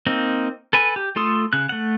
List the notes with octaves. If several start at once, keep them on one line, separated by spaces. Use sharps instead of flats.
A#3 C4 D#4
A4 B4 G#5
G4
A3 F4 A4 C6 D#6
C#3 F#6
A3 F#5